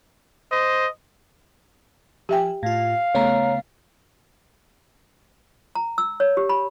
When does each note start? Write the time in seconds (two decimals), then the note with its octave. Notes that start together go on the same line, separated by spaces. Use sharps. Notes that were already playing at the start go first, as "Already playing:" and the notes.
0.52 C5 D#5
2.29 F3 G4 E5 G5 G#5
2.63 A2 F4 F5
3.15 C#3 A3 B3 C#5 A#5
5.75 A#5
5.98 E6
6.20 C#5
6.37 G4
6.49 B5